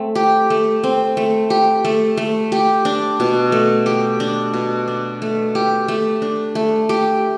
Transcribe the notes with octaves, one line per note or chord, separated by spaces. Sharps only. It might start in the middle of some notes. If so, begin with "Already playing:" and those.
Already playing: A3 C4
G4
A3
C4
A3
G4
A3
A3
G4
D4
B2
A3
G4
D4
B2
D4
A3
G4
A3
D4
A3
G4